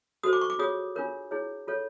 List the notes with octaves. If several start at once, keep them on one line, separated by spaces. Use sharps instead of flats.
F#4 A4 C5 D#6
D6
C#6
D6
F4 G#4 C#5 D#6
D4 F4 A#4 C#5
E4 G#4 C#5
F4 A4 C#5